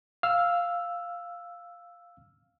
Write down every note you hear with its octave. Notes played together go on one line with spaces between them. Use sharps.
F5 E6 F6